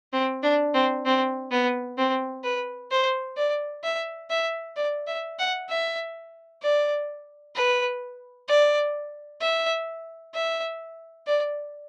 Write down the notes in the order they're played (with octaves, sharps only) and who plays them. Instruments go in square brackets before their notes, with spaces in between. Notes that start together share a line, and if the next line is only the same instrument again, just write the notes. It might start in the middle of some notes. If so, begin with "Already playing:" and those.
[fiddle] C4
D4
C4
C4
B3
C4
B4
C5
D5
E5
E5
D5
E5
F#5
E5
D5
B4
D5
E5
E5
D5